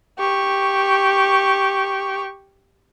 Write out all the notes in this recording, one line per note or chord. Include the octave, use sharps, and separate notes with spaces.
G4 C#6